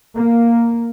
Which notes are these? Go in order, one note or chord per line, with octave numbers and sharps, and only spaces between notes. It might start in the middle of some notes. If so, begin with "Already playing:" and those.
A#3